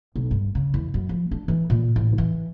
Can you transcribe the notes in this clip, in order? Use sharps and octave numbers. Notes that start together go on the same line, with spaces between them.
B1
G2
C#3
E2
F#2
F3
D4
E3
A#2
A1
E3